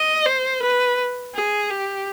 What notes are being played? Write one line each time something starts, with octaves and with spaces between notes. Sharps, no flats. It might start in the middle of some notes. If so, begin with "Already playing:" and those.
Already playing: D#5
C5
B4
G#4
G4